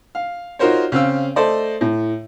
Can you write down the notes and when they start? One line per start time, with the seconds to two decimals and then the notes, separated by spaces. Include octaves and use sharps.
0.15 F5
0.59 D#4 F4 F#4 A#4 C5 C#5
0.92 C#3 C4 F5 E6
1.36 A3 A4 C5 D5 D#5
1.81 A2